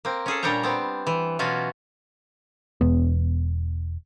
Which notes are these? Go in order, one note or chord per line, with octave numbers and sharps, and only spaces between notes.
A#3 C4
C#4 G#4 A4
A#2 G3 D4 C#5 G5 A#5
B3 C4
E3
B2 E3 F#3 C#4 F4 F#4
E1 B3